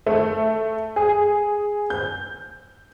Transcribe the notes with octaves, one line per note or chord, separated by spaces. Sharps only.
A3
G#4
G6